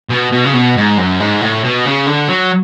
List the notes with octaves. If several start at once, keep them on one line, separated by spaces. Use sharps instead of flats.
B2
B2
C#3
B2
G#2
F#2
G#2
A2
B2
C#3
D3
F#3